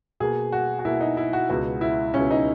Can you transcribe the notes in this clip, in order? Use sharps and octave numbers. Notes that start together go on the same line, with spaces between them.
B2 A#3 G#4
F#4
F#4
B2 A#3 E4
D#4
E4
F#4
C#2 B2 G#3 B3 F#4
E4
C#2 B2 G#3 B3 C#4
D#4